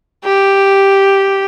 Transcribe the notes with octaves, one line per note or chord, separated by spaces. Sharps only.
G4